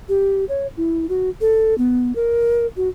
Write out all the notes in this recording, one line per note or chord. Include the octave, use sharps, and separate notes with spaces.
G4
C#5
E4
F#4
A4
B3
A#4
F#4